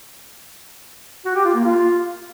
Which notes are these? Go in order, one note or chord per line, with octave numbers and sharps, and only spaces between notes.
F#4
G4
F4
A#3
F4